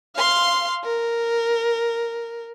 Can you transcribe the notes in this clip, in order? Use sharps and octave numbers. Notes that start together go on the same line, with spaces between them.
F5 C6
A#4